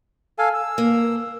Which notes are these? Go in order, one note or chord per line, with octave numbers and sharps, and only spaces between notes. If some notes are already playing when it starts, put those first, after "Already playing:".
A4 F5 G#5
E6
A#3